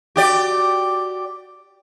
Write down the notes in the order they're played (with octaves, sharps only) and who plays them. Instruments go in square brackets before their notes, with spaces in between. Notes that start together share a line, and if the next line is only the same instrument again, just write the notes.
[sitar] F#4 G4 D5